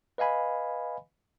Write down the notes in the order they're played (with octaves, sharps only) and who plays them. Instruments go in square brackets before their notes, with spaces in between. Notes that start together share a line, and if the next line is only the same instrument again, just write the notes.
[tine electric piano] B4 D#5 F5 G#5 B5